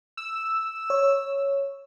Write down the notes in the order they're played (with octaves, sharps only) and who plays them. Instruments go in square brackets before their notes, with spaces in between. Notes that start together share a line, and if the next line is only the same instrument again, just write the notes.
[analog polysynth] E6
[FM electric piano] C#5